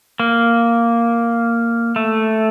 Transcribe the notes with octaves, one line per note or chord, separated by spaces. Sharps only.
A#3
A3